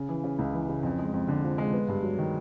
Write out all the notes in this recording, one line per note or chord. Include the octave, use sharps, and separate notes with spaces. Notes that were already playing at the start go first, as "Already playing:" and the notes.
Already playing: C#3
E3
C#3
C#2
E3
C#3
F2
G#3
F2
D3
F3
G#3
B3
G2
F#3
D#3